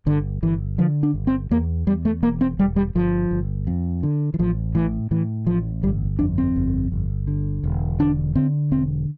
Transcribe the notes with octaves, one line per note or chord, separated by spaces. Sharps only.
G1 D3
G1 E3
D3 F3
D4
G1
C4
E2 A#3
E2 G3
A3
E1 A#3
C4
E1 G3
G3
G1 F3
G1
F2
D3
E3
A1 F3
A2 E3
A2 E3
A1 F3
G1 G3
F2 D4
C4
G1
G1
D3
E1
D3 D4
D3 C4
E1 C4